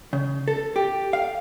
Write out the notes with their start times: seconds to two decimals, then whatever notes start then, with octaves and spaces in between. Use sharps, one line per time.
0.13 C#3
0.48 A4
0.76 G4
1.13 F5